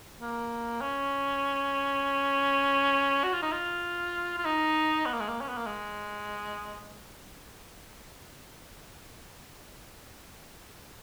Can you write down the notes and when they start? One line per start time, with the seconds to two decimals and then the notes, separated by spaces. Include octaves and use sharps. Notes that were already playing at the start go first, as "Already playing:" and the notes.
0.21 A#3
0.82 C#4
3.24 F#4
3.33 F4
3.43 D#4
3.52 F4
4.38 F4
4.45 D#4
5.06 B3
5.13 A#3
5.20 G#3
5.28 A#3
5.41 C#4
5.49 B3
5.57 A#3
5.66 G#3